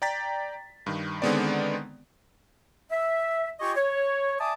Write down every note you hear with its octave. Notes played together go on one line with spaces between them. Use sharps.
D5 G5 A#5 A6 B6
G2 D#3
D3 D#3 G#3 B3 C4 D5
E5
F4 G4 D#5 G5 G#5 C#6
C#5
D5 E5 G#5 A5 D6 D#6